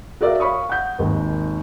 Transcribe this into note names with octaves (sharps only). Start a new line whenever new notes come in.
F#4 A#4 D5 E5 F5
C#5 F5 B5 C#6 D#6
F#5 G6
G#1 D#2